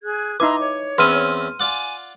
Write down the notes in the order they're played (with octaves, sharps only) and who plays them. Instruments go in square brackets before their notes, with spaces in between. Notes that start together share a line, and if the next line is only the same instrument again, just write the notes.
[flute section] G#4 F#6 G#6
[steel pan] D#4 E4 B4 [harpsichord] G#5 [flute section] A#5 C6 E6 [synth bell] D6
[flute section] C#5
[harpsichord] E2 C4 C#4 [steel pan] B4 [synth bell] C6 F6 D#7
[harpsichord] F4 D5 F#5 [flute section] G#5